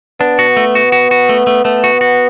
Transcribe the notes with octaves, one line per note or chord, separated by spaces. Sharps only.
B3 D4
F#4
A3
F#4
F#4
F#4
A3
A3
A3 B3
F#4
F#4